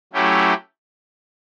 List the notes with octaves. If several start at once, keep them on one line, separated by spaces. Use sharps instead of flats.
F#3 A3 C#4 E4 G4